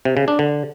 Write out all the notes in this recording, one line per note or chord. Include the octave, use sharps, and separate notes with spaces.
C3
C#3
D4
D3